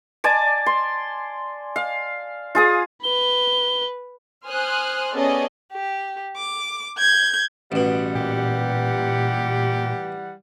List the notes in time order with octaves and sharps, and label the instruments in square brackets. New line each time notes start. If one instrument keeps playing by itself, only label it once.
[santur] D5 G#5 A5 D6
C6
F5
F4 G#4 D#6
[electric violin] B4 [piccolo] G7
[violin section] C5 G#5 C6 D#6 F6 F#6
B3 C#4 G#4 A4 D5 D#5
[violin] G4
D6
G6 G#6
[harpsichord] A1 B2 [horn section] E3 G3 F#5
[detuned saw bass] A#2 [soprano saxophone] G4